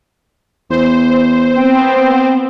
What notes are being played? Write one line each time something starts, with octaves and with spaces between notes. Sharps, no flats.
E2 C5
B3 C4 G5